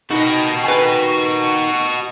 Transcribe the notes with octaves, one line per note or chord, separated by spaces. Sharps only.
B2 D#3 F#4 D#5
B4 G#5